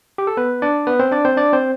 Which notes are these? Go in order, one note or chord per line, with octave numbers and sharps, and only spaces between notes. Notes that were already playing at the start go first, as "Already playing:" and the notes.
G4
A4
B3 B4
D4 D5
B3 B4
C4 C5
D4 D5
C4 C5
D4 D5
C4 C5